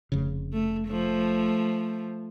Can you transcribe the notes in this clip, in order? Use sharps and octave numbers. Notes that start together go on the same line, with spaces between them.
F1 C#3
A3
F3 A3